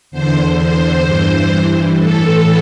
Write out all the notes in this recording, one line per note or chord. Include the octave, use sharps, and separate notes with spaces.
E2 D3 C5
C5
G2 E3
A2 E3 A4